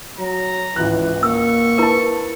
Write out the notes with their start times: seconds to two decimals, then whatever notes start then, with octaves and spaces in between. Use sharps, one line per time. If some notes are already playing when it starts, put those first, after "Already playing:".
0.19 F#3 A#5
0.76 G#1 C#2 E3 F#6
1.23 A#3 C#6 E6
1.78 E4 A#4 B4 A5